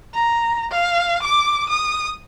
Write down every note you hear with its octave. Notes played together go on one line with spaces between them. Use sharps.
A#5
F5
D6
D#6